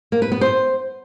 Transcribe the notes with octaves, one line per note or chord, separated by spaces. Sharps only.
A#3
B4
B3
C5